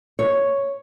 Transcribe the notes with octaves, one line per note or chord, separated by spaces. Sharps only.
C#5